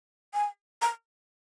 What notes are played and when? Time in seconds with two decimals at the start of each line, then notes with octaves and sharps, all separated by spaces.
0.34 G#5
0.82 A#5